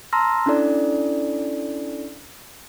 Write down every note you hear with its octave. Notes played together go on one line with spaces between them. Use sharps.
A5 A#5 C6 E6 F6 A#6
C#4 D4 E4 A4 D5